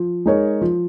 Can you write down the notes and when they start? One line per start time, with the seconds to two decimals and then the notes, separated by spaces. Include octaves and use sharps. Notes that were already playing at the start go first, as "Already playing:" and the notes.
Already playing: F3
0.26 G#3 D#4 A#4 C#5
0.61 F3